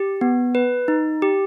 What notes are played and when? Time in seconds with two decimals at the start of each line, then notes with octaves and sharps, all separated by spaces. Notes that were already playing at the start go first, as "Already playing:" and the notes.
Already playing: G4
0.21 B3
0.55 B4
0.88 D#4
1.22 G4